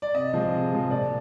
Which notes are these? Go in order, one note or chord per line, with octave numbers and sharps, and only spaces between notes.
D5
C3 D#5
F3 G#3
C3
F3 G#3
A#2 D5